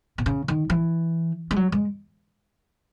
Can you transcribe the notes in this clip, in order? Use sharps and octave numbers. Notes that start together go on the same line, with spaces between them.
B2
C#3
D#3
E3
G#3
F#3
G#3